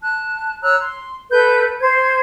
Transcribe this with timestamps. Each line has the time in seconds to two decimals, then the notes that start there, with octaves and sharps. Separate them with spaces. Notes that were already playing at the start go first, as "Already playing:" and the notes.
0.01 A5 F#6
0.62 C#5 A#5 E6 F#6
0.79 C6
1.30 A4 B4 G6
1.80 C5 G#6